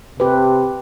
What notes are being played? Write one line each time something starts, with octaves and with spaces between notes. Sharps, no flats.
C3 G4 B4